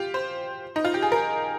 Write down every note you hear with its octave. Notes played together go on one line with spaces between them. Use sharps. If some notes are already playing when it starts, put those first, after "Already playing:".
Already playing: F4 G4
C5
D#4
F4
G4
G#4
A#4